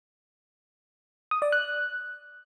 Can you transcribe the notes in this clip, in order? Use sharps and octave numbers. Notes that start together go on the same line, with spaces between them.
D#6
D5
F#6